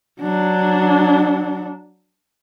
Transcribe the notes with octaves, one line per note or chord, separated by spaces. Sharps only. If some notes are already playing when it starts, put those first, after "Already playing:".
F#3 D4